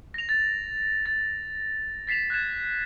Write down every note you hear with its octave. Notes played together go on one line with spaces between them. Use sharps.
A#6 F7
A6
A6
A6 B6 C7 E7 F7
F#6 G#6 A6 E7